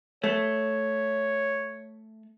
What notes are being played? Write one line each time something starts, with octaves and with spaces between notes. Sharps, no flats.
A3 C#5